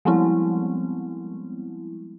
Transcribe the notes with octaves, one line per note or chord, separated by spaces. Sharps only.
F3 G3 G#3 B3 C4 E4